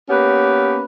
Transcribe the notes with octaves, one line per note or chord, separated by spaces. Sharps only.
A#3 B3 C#4 G4 B4